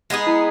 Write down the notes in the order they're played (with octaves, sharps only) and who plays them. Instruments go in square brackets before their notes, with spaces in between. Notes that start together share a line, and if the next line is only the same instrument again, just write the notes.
[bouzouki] G#3 B3 D#4 G#4
[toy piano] E4